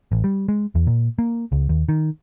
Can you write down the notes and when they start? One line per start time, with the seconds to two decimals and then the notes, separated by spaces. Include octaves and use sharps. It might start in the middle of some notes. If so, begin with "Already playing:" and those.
0.12 A1
0.24 G3
0.49 G#3
0.75 E2
0.87 A#2
1.19 A#3
1.52 C#2
1.69 D#2
1.89 D#3